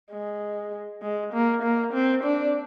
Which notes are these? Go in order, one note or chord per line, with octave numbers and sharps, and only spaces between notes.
G#3
G#3
A#3
A#3
C4
D4